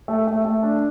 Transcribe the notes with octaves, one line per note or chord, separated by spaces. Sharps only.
A3
A3
A3
D4